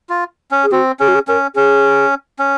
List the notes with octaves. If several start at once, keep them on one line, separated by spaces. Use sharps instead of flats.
F4
C#4
G#4
C4 F#4
C#4 G#4
F#4
G#4
C#4 A#4
C#4 G#4
C#4